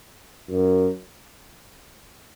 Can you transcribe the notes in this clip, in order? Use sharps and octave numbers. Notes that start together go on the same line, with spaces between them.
F#2